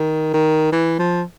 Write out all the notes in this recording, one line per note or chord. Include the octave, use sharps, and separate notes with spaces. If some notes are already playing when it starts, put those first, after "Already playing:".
Already playing: D#3
D#3
E3
F3